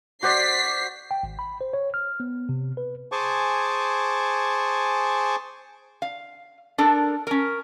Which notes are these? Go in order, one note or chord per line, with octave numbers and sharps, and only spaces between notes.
F#4 C5 D5 B6 C7
G5
G#1
B5
C5
C#5
F6
B3
C3
B4
G#4 C5 G#5 A5 C#6 D6
F5
D4 A4 A#4
C#4 A#4